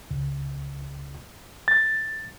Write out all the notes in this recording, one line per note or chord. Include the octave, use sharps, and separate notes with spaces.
C#2
A6